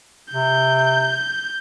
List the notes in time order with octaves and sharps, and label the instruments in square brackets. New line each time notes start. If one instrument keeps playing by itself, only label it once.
[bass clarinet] C3 [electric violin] G6